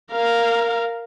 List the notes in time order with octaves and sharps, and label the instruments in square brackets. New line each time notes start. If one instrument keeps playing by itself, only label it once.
[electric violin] A#4 F5